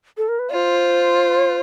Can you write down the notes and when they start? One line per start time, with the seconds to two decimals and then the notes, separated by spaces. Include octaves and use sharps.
0.17 A4
0.28 A#4
0.39 B4
0.50 F4 C5 D5